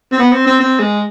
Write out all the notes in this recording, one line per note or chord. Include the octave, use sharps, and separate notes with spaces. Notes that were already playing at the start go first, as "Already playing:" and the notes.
C4
B3
C4
C4
C4
G#3